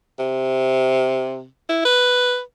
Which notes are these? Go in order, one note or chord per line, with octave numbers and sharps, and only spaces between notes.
C3
E4
B4